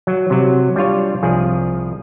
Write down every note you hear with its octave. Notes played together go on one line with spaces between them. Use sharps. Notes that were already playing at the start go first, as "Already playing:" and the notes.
F#3
C3 F#3
G3 D4 F4 C#5
C2 F3 G#4